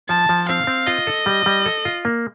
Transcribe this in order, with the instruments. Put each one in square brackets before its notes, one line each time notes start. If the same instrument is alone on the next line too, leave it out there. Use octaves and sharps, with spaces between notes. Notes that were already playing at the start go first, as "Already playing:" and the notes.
[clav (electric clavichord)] F3 [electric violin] A5
[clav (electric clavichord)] F3
[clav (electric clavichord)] C4 [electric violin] F5
[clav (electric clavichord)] C4
[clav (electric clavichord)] F4 [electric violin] D#5
[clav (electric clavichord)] A4
G3
G3
A4
F4
A#3